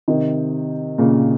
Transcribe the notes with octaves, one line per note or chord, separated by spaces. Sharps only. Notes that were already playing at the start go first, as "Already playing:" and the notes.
C3 D#3
A#2 C#3